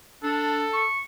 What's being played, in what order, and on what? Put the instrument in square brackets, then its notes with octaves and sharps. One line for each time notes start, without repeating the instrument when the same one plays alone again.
[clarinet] D4 [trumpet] A4
[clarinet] C#6